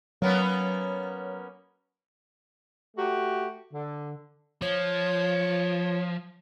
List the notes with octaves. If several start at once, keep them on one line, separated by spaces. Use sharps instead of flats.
F#3 A#3 B3 C#4
A3 F#4 G4
D3
F3 C#5